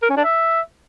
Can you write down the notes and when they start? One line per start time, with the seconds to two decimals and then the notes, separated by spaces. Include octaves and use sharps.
0.02 A#4
0.10 C#4
0.17 D4
0.24 E5